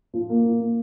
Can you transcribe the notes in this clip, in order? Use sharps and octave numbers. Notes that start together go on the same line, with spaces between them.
F3
A#3
F3
A#3